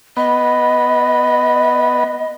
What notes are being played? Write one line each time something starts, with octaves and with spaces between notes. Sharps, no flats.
B3 D#5